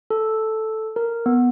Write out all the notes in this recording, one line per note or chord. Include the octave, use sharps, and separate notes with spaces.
A4
A#4
B3